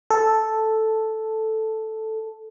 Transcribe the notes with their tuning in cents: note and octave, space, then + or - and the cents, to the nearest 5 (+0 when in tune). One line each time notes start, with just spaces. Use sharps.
A4 +0